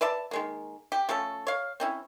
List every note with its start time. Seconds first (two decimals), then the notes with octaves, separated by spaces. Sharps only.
0.01 B4 D5 E5 A5
0.31 D#3 G#3 A#3
0.92 G4
1.09 F3 A3 C#4 A4
1.47 C#5 F5
1.80 C4 C#4 E4